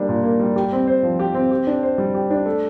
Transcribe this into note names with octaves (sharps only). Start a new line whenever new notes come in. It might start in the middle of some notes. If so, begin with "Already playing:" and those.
Already playing: G3 A#3 D4
A#2
A#3
G3
G4
C4
C5
F3
G4
C4
G4
D4
C5
G3
G4
D4
A3